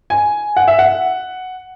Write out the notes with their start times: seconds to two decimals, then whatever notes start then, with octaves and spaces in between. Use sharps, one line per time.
0.10 G#5
0.56 F#5
0.68 E5
0.79 F#5